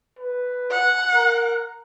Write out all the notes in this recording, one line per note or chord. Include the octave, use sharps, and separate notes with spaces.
B4
F#5
A#4